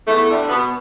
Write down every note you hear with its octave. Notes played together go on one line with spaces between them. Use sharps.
E2 A3
D3 G3
B2 B3